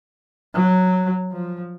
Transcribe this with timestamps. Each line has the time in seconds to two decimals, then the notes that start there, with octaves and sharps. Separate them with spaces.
0.54 F#3
1.32 F3